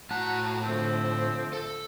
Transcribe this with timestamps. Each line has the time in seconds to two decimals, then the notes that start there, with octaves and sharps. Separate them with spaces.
0.11 A2 F#4 F#5 A5 A#5
0.65 D3 F3 A3 C4
1.53 A4